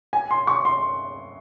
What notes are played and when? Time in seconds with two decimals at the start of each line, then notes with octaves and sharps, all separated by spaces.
0.13 G#5
0.31 C6
0.47 C#6
0.65 C6